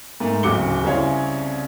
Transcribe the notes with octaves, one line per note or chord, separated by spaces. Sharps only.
G#2 A3 A#3
D1 C#3 F#4 D6 C#7 G7
C2 C#3 C4 E4 C#5 F5